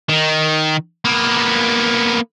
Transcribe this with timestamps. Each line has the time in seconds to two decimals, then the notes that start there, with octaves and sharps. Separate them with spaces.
0.09 D#3
1.05 A#3 B3